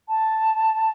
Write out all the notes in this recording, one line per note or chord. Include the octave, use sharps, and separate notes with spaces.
A5